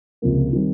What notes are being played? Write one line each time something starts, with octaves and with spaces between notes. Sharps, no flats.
C#2 C3 F3 A#3
D#3 G3 C4